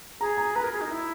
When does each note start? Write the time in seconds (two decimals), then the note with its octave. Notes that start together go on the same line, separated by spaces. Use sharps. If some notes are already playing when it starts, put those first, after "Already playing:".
0.20 G#4 A#5
0.37 A#5
0.55 B4 A#5
0.64 A#4
0.73 G#4
0.81 D#4
0.91 E4